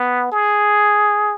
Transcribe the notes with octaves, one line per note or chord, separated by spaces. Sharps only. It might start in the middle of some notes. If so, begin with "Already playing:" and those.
Already playing: B3
G#4